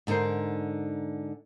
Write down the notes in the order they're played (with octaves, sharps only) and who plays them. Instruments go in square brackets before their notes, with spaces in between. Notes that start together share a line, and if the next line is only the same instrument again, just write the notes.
[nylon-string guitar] G#2 D3 D#4 A#4 C5